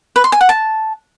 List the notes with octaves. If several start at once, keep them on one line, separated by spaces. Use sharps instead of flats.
B4
C6
G#5
F#5
A5